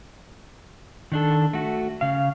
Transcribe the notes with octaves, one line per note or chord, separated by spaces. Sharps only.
D#3 D4 A4
A3 F#4
C#3 F5